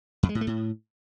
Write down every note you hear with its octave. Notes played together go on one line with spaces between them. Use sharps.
F2
G#3
A2
A3
A2